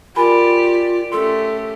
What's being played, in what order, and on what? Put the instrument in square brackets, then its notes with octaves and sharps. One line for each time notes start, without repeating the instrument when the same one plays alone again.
[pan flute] F4 [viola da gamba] G4 D5 [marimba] A#4 G#5 B5
[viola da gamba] A3 C#4 G4 [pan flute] A4 [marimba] C6